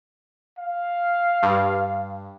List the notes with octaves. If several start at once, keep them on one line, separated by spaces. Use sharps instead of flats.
F5
G2